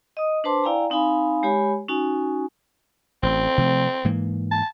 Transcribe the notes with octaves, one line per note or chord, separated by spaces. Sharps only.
D#5 D#6
D4 B4 C5 A5 C6 D6
E4 D5 F5 G5 G#5 A#5
C4 D#4 F5 G#5 B5
G#3 G4 C#5 G#5 B5
C#4 D#4 F#4 G#5
A1 C4
C3 F3 A3
G#2 E3 A#3
A5